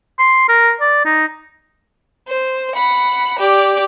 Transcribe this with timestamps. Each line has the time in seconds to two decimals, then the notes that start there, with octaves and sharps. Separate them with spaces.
0.19 C6
0.49 A#4
0.81 D5
1.05 D#4
2.28 C5
2.75 F#5 B5
3.39 G4 D5